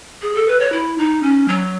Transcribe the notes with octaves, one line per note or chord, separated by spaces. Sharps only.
G#4
A4
B4
C#5
E4
D#4
C#4
F#3